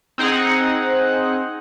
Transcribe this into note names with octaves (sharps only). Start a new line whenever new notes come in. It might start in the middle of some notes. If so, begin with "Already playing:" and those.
C4 D#4 G#4 F#5